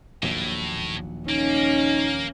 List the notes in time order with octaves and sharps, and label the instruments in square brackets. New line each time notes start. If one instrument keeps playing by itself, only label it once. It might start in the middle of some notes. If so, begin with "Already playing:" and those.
[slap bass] A#1 D#2 F#3 [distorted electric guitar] A2
[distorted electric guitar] A#3 [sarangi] C#4 [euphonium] D#4